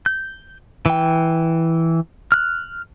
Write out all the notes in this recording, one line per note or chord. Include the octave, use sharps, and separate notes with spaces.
G6
E3 G5
F6 F#6